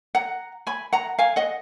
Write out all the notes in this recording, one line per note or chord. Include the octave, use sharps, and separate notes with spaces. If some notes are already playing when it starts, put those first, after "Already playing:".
F#5 A#5
G#5 B5
F#5 A#5
F5 G#5
D#5 F#5